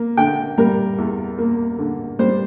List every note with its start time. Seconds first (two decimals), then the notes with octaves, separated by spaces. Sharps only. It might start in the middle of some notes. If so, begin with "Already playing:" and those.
Already playing: A#3
0.17 D3 G5
0.58 G3 A#4
0.98 E2
1.38 A#3
1.78 D3
2.19 G3 C5